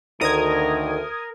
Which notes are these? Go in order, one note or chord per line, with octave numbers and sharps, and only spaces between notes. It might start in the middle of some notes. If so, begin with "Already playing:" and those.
D2 D#3 A#4 D#6 G#6